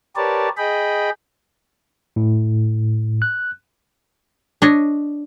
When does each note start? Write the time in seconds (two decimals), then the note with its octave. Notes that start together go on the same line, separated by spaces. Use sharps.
0.16 G4 A#4 B4 C#5 D5 A5
0.57 G#4 D#5 G5 B5
2.16 A2
3.22 F#6
4.62 D4 C#5 D#5